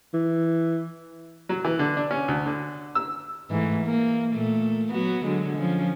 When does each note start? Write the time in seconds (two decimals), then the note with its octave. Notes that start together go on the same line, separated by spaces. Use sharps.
0.14 E3
1.49 F#3
1.65 E3
1.79 D3
1.97 D4
2.11 C#4
2.28 D2
2.46 D3
2.95 E6
3.50 G#2 E3 A3
3.84 A#3
4.33 A#2 A3
4.91 F#3 B3 F#4
5.25 D3 F#3 G#3
5.58 F3 C#4